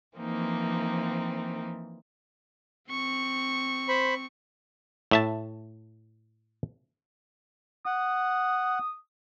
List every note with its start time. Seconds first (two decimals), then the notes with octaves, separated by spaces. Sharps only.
0.15 E3 F3 A#3 C4 D#4
2.90 C4 C#6
3.88 C5 B5
5.11 A2 E5 A5
7.86 F#5 D#6